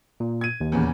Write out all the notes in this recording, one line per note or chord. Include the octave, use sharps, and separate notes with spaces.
A#2
G#6 D#7
D#2
E2 A#2 C#3